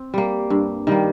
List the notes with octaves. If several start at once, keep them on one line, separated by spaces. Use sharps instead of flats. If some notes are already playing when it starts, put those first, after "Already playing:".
Already playing: C4
G3 A#3
G2
D#3 G3 A#3